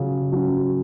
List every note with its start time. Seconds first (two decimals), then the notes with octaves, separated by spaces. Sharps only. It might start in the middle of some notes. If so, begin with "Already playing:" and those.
Already playing: C#3 F#3 C#4
0.32 F#3 C#4